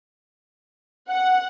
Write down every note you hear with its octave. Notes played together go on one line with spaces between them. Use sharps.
F#5